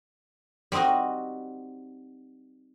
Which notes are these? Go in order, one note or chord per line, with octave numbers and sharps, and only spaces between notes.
G3 C4 D#4 F#4 D#5